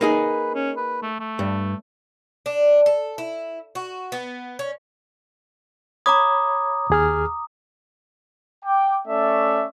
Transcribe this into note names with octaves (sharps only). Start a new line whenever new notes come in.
A#3 D#4 G#4 B4
C#4
B4
A3
A3
G2
D4
A4
E4
F#4
B3
C#4
C#5 A#5 B5 D6 D#6 G#6
D#2 G#4 F6
G5 D6
A3 C#4 D5 E5